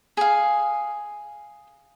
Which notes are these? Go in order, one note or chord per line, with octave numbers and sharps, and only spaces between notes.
G#4 F5